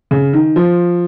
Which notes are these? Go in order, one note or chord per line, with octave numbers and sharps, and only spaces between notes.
C#3
D#3
F3